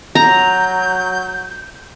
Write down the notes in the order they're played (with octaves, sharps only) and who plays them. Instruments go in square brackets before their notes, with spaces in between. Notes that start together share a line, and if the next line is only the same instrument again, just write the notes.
[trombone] F#3 [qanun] A#5 [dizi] G6